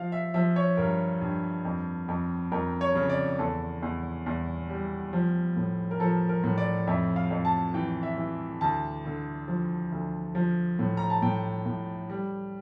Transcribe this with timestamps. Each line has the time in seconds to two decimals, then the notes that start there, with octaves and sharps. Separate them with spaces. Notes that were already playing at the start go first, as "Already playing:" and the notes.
Already playing: F3 F5
0.12 E5
0.34 F3 E5
0.56 C#5
0.77 G2 A#4
1.21 G2
1.65 F2
2.08 F2
2.52 F2 A#4
2.81 C#5
2.95 C#3
3.10 D5
3.39 E2 A4
3.82 E2
4.26 E2
4.69 G3
5.13 F3
5.56 A2
5.91 A#4
6.00 F3 A4
6.29 A#4
6.44 A2
6.58 D5
6.87 F2 E5
7.16 F5
7.31 F2
7.45 A5
7.74 E3 G5
8.03 E5
8.18 E3
8.61 D2 A5
9.05 D3
9.48 F3
9.92 D2
10.35 F3
10.79 A2
10.97 A#5
11.10 A5
11.22 A2 G5
11.66 A2
12.10 G3